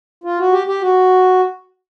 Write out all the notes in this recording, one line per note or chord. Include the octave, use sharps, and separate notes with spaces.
F4
F#4
G4
G4
F#4